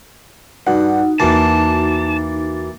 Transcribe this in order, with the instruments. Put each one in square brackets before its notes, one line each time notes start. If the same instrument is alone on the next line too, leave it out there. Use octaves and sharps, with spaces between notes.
[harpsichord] G2 [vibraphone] D#4 [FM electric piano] F#4 F#5
[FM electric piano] E2 F#4 A6 [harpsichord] E3 A#3 [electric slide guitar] A5